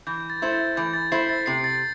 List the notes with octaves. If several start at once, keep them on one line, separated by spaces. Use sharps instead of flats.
E3 G6
A6
A3 E4 C5
A6
E3 G6
A6
A3 E4 C5 C7
A6
C3 C7
A6